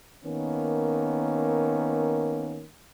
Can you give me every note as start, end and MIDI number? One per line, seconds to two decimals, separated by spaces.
0.25 2.64 51
0.25 2.64 58
0.25 2.64 59
0.25 2.64 61